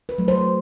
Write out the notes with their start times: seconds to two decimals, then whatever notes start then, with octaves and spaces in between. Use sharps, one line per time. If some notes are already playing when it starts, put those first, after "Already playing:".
0.09 B4
0.18 F#3 A3
0.28 C5